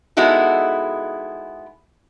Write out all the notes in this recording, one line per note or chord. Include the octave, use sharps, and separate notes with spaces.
G#3 B3 D#4 E4 F#4 A4